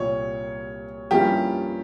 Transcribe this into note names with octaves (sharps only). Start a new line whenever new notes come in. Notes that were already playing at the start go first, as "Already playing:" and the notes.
Already playing: C2 A#2 G3 C#5
G2 F3 A#3 C#4 E4 G4